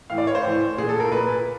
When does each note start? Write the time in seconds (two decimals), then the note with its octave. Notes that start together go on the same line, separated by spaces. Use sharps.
0.10 A2 E3 F5
0.18 D5
0.27 C#5
0.35 C5
0.44 A2 E3
0.78 A#2 G#4
0.89 A4
1.00 A#4
1.11 A#2 B4